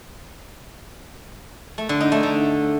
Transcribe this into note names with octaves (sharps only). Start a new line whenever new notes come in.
A3
D3
D#4
A3
D3